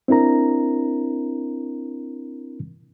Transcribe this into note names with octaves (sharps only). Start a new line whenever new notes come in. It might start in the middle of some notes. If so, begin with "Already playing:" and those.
C4 D4 E4 A#4 A#5